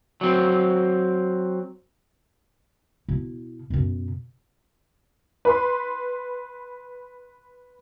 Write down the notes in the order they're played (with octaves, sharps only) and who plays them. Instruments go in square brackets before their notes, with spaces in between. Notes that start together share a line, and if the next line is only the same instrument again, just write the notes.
[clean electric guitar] F#3 C4
[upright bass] B2 E4
F#2 B2
[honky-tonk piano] B4 B5 C6